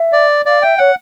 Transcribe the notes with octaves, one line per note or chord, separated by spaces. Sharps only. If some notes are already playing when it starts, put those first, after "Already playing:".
Already playing: E5
D5
D5 F5
E5 G5
C#5 F#5